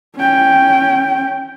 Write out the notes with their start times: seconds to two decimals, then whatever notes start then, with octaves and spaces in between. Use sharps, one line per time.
0.17 C#4 G5